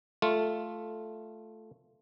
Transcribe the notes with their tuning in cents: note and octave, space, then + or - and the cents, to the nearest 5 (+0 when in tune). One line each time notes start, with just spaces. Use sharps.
A3 -5 F4 +0